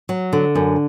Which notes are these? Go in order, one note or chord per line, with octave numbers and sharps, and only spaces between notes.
F#3
D3
F#2